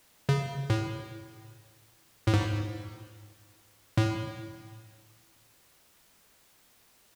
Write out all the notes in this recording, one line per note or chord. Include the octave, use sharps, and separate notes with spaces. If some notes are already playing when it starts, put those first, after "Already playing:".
C#3
A2
A2
G#2
A2